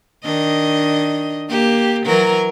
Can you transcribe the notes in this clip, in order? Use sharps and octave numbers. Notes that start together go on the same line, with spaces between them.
D#3 D4 D#5
A#3 G4
E3 F#3 A#4